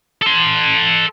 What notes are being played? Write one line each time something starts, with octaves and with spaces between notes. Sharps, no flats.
A4 C6